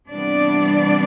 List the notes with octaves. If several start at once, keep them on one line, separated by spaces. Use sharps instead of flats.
C3 E3 G3 B3 D4 D5